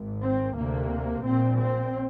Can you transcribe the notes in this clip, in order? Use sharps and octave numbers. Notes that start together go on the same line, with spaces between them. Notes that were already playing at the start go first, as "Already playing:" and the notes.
Already playing: G#1 G#2
C4
D2 C3 A#3
A#1 A#2 C4
C4